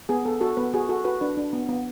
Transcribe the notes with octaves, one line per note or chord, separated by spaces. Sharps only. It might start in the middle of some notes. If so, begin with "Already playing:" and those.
B3 G#4
B3 A4
F#4 A4
B3 B4
F#4 G#4
F#4 A4
F#4 B4
D4 B4
D4
B3
B3